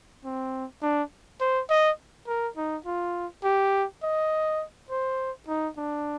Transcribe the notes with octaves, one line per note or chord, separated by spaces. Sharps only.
C4
D4
C5
D#5
A#4
D#4
F4
G4
D#5
C5
D#4
D4